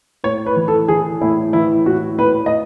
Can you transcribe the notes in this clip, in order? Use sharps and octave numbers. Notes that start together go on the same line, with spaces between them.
A2 C#5
B4
E3
A4
E3 G#4
A2 E4
E3 E4
A2 F#4
A2 B4
D#5